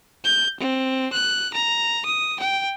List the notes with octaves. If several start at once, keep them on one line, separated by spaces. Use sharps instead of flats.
G6
C4
F#6
A#5
D#6
G5